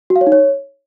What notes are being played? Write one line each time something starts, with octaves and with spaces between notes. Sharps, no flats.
F#4
F5
C#5
D#4
C#5